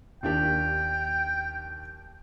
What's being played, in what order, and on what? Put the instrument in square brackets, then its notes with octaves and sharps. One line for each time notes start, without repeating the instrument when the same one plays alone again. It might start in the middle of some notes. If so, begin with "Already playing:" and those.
[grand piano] D#2 D4 G4 [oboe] G5